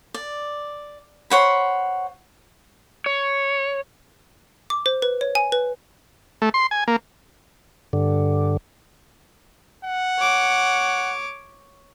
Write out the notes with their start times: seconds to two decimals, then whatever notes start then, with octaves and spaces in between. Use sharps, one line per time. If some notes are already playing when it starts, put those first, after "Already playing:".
0.14 D5
1.30 C5 C#5 F#5 B5
3.06 C#5
4.70 D6
4.86 C5
5.02 B4
5.21 C#5
5.35 G#5
5.52 B4
6.42 A3
6.54 C6
6.71 G#5
6.88 A#3
7.93 G2 D3
9.84 F#5
10.19 C#5 D6